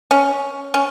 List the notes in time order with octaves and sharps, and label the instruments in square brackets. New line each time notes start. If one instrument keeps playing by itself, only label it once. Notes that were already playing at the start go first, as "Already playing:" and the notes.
[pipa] C#4
C#4